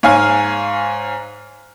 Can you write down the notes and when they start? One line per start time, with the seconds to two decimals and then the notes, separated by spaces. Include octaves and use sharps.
0.03 G#2 C#5 F5 G#5 F6